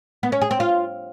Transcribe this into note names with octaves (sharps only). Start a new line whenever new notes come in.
B3
C#4
G#4
C4
F4